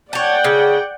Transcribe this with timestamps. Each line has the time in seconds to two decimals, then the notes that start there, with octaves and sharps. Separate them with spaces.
0.13 C#5 D5 F#5 G5 A5
0.44 C#3